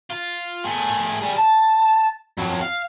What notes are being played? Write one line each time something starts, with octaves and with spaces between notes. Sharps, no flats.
F4
A3 G#4
G3 G#4
A5
F2 F#3
F5